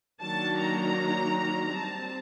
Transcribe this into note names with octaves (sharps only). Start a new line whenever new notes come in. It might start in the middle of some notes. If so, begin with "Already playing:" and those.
D#3 F#3 A#3 D4 A5
A#5
G3 C4 A5